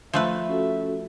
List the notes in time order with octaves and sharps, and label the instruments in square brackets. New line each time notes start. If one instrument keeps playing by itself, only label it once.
[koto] F3 A3 B4 [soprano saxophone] E5
[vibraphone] C#4 F#4 A4